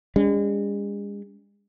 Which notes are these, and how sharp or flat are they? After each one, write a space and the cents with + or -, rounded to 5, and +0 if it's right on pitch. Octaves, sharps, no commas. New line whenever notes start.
G#3 -40 D4 -45